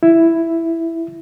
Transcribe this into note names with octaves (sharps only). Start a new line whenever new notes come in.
E4